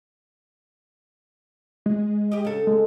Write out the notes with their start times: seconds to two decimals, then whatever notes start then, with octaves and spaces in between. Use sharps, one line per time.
1.86 G#3
2.32 G4 D#5
2.45 C#3 A4
2.67 G#3